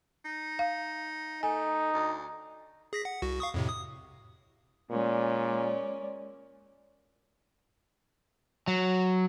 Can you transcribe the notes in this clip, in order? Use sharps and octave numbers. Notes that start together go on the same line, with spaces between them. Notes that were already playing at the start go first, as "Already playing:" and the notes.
D#4
F5
A3 D#4 G#5
D2
G#4 A#6 B6
F#5
C2 F#4
F5 C#6 D#6
F2 A2 C3
D#6
A#2 G#3 C#4 D5
F#3